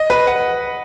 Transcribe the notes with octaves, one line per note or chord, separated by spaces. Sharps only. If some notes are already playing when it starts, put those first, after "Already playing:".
Already playing: D#5
B4
F#5